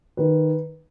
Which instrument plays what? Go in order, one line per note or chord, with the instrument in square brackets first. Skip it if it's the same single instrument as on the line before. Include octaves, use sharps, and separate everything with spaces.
[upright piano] D#3 B4